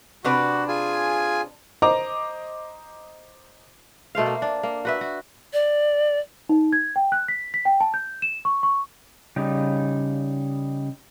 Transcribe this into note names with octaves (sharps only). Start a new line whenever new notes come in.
C3 D4 F#4 B4
F4 G#4 G#5
C5 D#5 A#5 D6
B2 A3 C5 F5
A#3
D4
A#3
F#4 B4 E5
F#4
D5
D#4
G#6
G5
F#6
B6
B6
G5
A5
G6
E7
C#6
C#6
C#3 G3 D#4